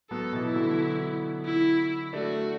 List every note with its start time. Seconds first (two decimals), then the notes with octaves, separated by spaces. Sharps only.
0.10 F#3 B3 A4
0.33 B2 E3
0.45 E4
0.55 D3 F#3
1.45 E4
2.13 A3 D4 F#4